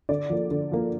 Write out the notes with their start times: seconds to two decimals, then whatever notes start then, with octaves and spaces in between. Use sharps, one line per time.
0.09 D3 D5
0.30 F3 A#3
0.51 D3
0.72 F3 A#3